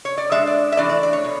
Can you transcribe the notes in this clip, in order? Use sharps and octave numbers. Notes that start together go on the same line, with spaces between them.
C#5
D5
D3 G#3 D4 E5
D5
E5
E3 A3 D4 D5
D5
D5
C#5
B2